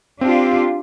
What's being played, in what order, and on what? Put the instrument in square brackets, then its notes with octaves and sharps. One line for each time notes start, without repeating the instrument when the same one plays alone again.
[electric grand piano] C4 [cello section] D4 F4 G4